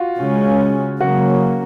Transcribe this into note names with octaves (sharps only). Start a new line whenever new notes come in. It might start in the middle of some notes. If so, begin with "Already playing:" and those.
Already playing: F4 F#4
C#3 G#3 C#4
C#3 F#3 A#3 C#4 F#4